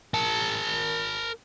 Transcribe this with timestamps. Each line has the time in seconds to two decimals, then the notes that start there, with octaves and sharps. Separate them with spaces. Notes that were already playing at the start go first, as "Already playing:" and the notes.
0.14 A#4 A5